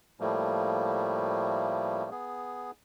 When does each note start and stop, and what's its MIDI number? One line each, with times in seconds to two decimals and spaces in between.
0.20 2.10 45
0.20 2.10 53
0.20 2.10 55
0.20 2.10 57
0.20 2.10 58
2.11 2.71 59
2.11 2.71 68